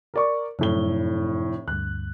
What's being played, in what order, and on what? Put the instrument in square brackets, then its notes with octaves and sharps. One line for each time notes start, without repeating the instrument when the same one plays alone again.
[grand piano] A#4 D5 C#6
[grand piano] F1 A2 G7 [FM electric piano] F#2
[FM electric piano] D2 G2 [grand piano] F#6